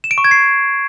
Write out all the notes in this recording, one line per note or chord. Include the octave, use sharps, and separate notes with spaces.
E7
D7
C#6
G#6
C7